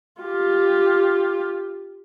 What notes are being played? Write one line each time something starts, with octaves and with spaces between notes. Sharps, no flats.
F4 G4